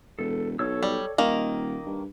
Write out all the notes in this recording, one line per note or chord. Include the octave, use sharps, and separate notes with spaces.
E1 A4
B1 A4 C#5 E6
G3
D#1 D#3 A#3 D#5
G2